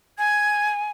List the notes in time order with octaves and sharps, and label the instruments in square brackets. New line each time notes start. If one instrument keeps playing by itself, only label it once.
[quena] G#5 [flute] G#6